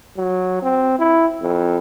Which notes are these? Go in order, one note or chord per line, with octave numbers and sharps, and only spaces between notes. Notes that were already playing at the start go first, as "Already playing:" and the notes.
F#3
C4
E4
F2